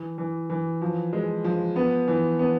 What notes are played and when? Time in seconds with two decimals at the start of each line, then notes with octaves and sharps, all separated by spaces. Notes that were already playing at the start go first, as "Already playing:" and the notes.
Already playing: E3
0.18 E3
0.50 E3
0.82 F3
1.13 G#3
1.44 F3
1.76 B3
2.08 E3
2.39 B3